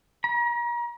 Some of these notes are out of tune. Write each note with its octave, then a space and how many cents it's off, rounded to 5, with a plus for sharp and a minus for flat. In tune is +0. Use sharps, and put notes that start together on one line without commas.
A#5 +35